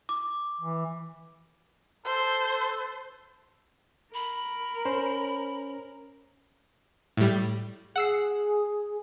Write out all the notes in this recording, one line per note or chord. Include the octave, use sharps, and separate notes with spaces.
D6
E3
A4 C5
A#4 B5
C#4 C5
A2 G3
G#4 F#5 E6 C7